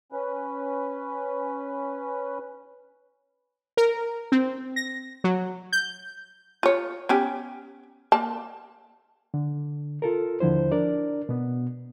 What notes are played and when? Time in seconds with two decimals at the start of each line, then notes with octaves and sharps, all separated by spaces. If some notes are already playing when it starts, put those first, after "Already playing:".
0.12 C#4 B4
3.77 A#4
4.32 C4
4.76 A#6
5.24 F#3
5.72 G6
6.63 F4 C#5
7.09 B3 C#4 G4
8.12 A#3 A5
9.34 D3
10.02 F4 A4 A#4
10.40 D#2 D3 F3 E4 C5
10.72 D4 A#4 D5
11.29 B2 B3